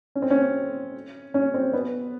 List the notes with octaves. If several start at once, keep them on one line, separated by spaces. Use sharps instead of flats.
C#4
C4
C#4
C#4
C4
B3